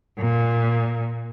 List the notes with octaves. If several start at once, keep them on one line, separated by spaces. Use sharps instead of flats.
A#2